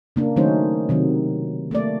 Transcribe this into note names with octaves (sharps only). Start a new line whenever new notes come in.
C#3 A#3 D4
D#3 F#3 A3 C#4 D#4 C5
C3 D#3 F#3
A3 A#3 D5